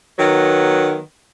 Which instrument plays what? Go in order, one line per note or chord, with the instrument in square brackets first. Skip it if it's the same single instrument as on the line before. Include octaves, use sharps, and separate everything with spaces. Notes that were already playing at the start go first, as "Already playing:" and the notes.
[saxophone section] D#3 F#3 B3